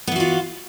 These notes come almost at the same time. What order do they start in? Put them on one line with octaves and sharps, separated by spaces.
B3 E3 F#4 F4